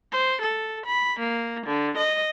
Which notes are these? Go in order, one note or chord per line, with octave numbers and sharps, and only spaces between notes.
C5
A4
B5
A#3
D3
D#5